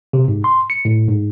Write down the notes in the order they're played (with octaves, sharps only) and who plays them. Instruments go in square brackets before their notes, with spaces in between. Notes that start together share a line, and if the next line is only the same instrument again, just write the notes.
[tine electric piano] C3
G#2
C6
C#7
A2
G#2